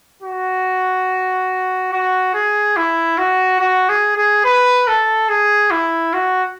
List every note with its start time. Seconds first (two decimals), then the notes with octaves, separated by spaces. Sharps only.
0.22 F#4
1.92 F#4
2.34 G#4
2.76 E4
3.18 F#4
3.60 F#4
3.89 G#4
4.16 G#4
4.44 B4
4.87 A4
5.29 G#4
5.71 E4
6.13 F#4